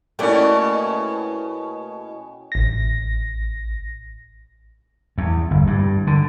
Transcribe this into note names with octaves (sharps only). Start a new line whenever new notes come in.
B2 A3 A#3 C#4 E4 D5 G5
A1 A#6
E2
G1
G2
D3